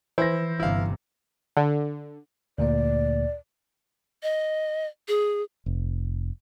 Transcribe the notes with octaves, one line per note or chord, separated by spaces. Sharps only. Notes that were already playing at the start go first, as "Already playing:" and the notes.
E3 E4 C5 A#6
G1 C3 E4 F5
D3
D2 A#2 A#3 D5
D#5
G#4
F1